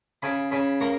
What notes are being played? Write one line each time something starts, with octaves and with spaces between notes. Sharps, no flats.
C#3 G#5 B5
C#3 G#5 B5
A#3 A#5 C#6